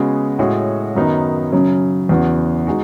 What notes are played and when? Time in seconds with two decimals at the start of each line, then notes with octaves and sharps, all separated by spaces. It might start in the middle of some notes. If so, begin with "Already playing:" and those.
Already playing: C#3 G#3 B3 F#4
0.39 A2 G#3 C#4 F#4
0.95 F#2 D#3 F#3 B3 D#4
1.52 F#2 C#3 F#3
2.09 E2 C#3 E3 B3 F#4
2.67 G#3 D#4 F#4